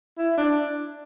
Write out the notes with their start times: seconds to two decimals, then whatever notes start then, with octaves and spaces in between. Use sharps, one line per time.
0.18 E4
0.37 D4